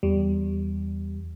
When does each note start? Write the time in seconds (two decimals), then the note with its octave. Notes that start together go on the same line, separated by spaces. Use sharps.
0.03 E2 G3